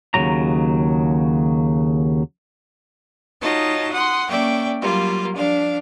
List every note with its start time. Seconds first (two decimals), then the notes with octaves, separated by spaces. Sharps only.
0.14 D#2 A#2 C#3 F#3 A#5
3.41 D#4 F4 F#4 C#5 D#5 A5
3.93 F#5 C6 D#6
4.28 A#3 C#4 D5 E5 G5 C#6
4.82 F#3 G3 A#3 F4
5.33 F3 D4 F5